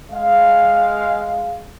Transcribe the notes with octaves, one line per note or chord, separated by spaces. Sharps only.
G#3 F5